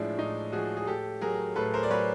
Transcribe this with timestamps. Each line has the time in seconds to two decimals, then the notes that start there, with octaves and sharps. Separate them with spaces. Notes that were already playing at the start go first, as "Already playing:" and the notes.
Already playing: A2 F3 G#3 D4 E4
0.18 A2 D#4
0.52 F3 G#3 F#4 G#4
0.77 G#4
0.87 A2 G4 A4
1.21 F#3 G#4 A#4
1.56 A2 A4 B4
1.74 A#4 C5
1.83 D5
1.90 F#3 B4 C#5